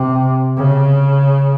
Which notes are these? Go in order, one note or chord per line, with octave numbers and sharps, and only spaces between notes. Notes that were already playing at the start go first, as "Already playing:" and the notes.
Already playing: C3
C#3